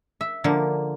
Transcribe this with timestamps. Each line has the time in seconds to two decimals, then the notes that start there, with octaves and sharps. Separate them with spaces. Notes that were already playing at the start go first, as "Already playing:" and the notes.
0.21 E5
0.44 D3 F3 A#3